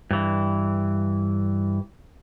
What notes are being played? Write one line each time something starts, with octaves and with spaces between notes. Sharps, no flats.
G2 E3